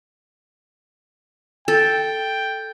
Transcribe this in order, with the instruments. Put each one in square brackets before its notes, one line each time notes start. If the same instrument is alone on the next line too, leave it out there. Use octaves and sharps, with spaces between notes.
[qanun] A4 [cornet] G5